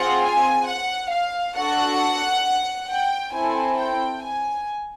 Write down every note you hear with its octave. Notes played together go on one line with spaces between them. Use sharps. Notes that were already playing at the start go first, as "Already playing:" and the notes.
Already playing: C4 F4 G#4 F#5
G#5
F#5
F5
D4 F#4 A4 F#5
G5
C4 E4 A4 G#5
G5
G#5